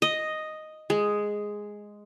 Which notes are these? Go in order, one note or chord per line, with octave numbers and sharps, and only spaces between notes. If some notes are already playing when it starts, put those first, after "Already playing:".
D#5
G#3